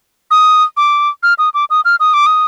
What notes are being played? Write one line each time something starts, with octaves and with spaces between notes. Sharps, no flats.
D#6
D6
F6
D#6
D6
D#6
F6
D#6
D6
D#6